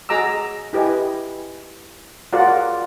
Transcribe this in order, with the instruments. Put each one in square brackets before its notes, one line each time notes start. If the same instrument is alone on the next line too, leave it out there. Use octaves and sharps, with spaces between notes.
[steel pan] F#4 G#4 D#5 A#5 D6 E6
E4 G4 B4 D#5 G#5
F4 F#4 G#4 A#4 D5 F#5